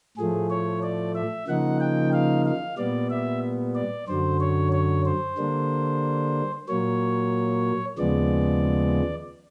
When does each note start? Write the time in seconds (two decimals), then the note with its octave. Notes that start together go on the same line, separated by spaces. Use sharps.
0.17 A2 F3 A3 G#4
0.50 C#5
0.83 D5
1.15 E5
1.47 C#3 F3 A#3 D#4 F#5
1.80 G5
2.13 F5
2.45 F5
2.78 A#2 G3 B3 D5
3.10 E5
3.75 D5
4.08 F#2 D3 F#3 C5
4.41 C#5
4.73 C#5
5.05 C5
5.38 D3 G3 A#3 D4
6.68 A#2 F#3 A#3 C#5
7.98 D#2 C#3 F3 G#3 B3 D5